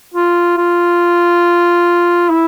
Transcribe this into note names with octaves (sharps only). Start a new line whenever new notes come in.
F4
F4
E4